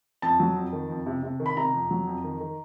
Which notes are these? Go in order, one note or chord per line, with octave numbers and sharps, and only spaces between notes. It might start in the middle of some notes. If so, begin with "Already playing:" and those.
F2 A5
F#3
F2
D#3
F2
C3
C3
D#3
B5
C3 A#5
F2
F#3
F2
D#3
D#3